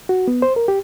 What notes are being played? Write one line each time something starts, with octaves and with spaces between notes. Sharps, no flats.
F#4
B3
C5
A#4
G4